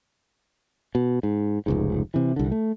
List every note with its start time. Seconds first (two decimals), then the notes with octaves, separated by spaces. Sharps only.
0.95 B2
1.23 G#2
1.66 F1 C#2 G#2
2.14 C3 E3
2.36 C2 D3
2.52 A3